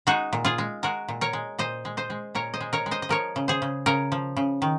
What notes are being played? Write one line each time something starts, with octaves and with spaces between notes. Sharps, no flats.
G#3 D#4 F#4
A#2
F4 G#4
G#3
G#3 F#4 A#4
A#2
A#4 C#5
G#3
A#2 C5 D#5
G#3
C5 D#5
G#3
A#2 A#4 C#5
C5 D#5
G#3
A#4 C#5
G#3
C5 D#5
D#5
F3 A#4 C#5
C#3
G#4 C5
C#3
C#3 A#4 C#5
F3
C#3
D#3